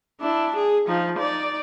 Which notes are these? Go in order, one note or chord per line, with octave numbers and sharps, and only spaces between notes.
D4 E4
G#4
F3 D#4
D#4 D5